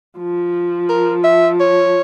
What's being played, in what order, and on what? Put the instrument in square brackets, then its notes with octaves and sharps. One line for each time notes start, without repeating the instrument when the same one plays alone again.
[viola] F3
[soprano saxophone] A#4
E5
C#5